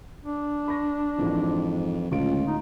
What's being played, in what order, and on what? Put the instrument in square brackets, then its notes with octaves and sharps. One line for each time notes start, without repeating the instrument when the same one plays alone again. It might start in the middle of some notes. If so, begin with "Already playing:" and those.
[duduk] D4
[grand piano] B5 C#6 A#6
[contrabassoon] F2 [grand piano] G#2 E3
[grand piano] D1 F4 D7 [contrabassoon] C#2
[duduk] D#4